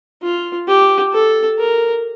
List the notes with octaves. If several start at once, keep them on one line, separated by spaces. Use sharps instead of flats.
F4
G4
A4
A#4